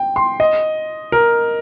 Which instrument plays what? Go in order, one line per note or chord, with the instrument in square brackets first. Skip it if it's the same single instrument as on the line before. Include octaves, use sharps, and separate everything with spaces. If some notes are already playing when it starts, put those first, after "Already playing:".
Already playing: [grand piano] G5
C6
D#5
A#4